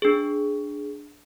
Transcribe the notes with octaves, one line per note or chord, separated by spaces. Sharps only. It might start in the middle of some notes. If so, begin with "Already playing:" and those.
D4 G#4